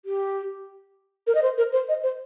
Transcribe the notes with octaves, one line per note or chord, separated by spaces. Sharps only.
G4
A#4
D#5
C5
A#4
C5
D#5
C5